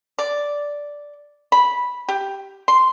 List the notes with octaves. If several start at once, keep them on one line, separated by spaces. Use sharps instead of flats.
D5
B5
G4
C6